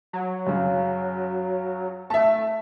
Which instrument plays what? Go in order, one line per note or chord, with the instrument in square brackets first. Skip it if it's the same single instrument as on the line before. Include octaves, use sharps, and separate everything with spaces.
[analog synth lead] F#3
[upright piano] F#2 C#3
[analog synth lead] A3 [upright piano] E5 A5